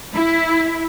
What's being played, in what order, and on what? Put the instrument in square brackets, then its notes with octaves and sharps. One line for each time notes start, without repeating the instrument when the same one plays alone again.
[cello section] E4